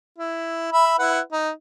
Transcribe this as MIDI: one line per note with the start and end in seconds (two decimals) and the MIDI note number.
0.18 0.69 64
0.73 0.99 76
0.73 0.99 83
0.99 1.20 64
0.99 1.20 71
0.99 1.20 78
1.32 1.50 63